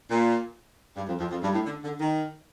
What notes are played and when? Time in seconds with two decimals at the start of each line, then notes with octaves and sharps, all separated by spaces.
0.09 A#2
0.95 G2
1.07 F2
1.19 F2
1.31 F2
1.42 G2
1.53 A2
1.64 D3
1.83 D3
2.00 D#3